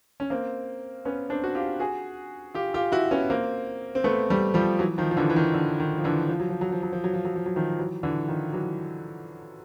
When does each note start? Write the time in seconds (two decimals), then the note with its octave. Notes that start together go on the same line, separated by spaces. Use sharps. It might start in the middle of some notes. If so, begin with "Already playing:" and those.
0.20 C#4
0.30 A#3 C4
1.05 B3 C#4
1.30 C4 D4
1.44 F#4
1.55 F4 G4
1.80 F#4 G#4
2.55 F4 G4
2.74 F4 G4
2.92 E4 F#4
3.11 B3 C#4
3.30 A#3 C4
3.95 C4
4.04 A3 B3
4.30 G3 A3
4.54 F3 G3
4.79 E3 F#3
4.98 D#3 F3
5.11 F3
5.17 D3 E3
5.30 E3
5.36 D#3
5.54 D3
5.80 D#3
5.98 F3
6.04 D3 E3
6.29 F3
6.40 F#3
6.50 F3
6.61 F#3
6.72 F3
6.83 F#3
6.93 F3
7.04 F#3
7.14 F3
7.25 F#3
7.36 F3
7.46 F#3
7.56 D#3 F3
7.78 E3 F#3
8.03 D3 E3
8.28 D#3 F3
8.53 E3 F#3